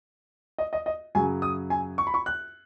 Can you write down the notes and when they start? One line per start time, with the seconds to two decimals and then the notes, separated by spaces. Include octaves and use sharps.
0.58 D#5
0.73 D#5
0.86 D#5
1.15 F#2 C#3 F#3 G#5
1.42 D#6
1.70 G#5
1.98 C#6
2.07 B5
2.14 C#6
2.26 F#6